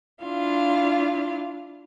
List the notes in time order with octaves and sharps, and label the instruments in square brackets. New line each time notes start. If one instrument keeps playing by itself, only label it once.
[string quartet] D4 E4 F4 F5